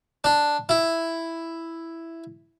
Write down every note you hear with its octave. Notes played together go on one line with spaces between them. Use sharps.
D4
E4